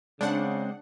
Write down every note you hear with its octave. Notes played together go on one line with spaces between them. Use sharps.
C#3 G#3 C4 D4 F#5